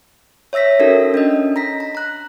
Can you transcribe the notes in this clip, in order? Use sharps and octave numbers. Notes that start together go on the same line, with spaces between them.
C#5 E5 E6 A#6 B6
C#4 D#4 F#4 A4 A#4
C#4 D4 D#5
A#5 A#6 B6
A#5
A#5 F#6